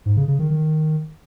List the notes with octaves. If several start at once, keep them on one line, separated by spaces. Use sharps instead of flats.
G#2
C#3
C#3
D#3
D#3